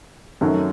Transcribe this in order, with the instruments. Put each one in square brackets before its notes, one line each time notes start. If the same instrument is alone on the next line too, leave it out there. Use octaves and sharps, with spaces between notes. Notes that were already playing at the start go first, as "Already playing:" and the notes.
[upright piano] F#2 D#3 F#3 A3